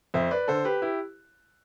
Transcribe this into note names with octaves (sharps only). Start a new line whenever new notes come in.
F2 C5 E5
B4 D5
D3 A4 C5
G4 B4
E4 G4